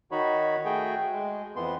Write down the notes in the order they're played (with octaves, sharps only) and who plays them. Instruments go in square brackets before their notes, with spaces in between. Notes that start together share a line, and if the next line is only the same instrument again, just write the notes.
[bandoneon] D#3 D#4 F#4 C#5 B5
A3 F#4 G#4 G5
G#3
F2 E3 B3 C6